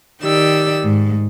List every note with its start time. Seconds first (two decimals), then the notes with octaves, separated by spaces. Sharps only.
0.24 D#3 G4 D5 E6
0.84 G#2